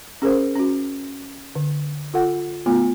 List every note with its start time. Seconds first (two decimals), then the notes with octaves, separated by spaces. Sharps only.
0.22 C#4 G#4 A#4 C5
0.56 C#4 F#4
1.55 D3
2.14 F4 A4 F#5
2.66 A3 B3 F4